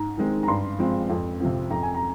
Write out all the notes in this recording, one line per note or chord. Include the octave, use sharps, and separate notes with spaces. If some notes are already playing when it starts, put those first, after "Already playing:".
Already playing: G#2 A#5
D#3 G#3 C4
A#5
G2 C6
F3 G#3 C4
F2
C3 F3 C4
F2 A#5
G#5
A#5